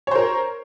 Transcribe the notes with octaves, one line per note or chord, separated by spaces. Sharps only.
A#4 C5 C#5